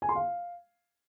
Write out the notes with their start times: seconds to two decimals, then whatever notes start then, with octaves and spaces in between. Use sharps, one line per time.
0.02 G#5
0.09 C6
0.16 F5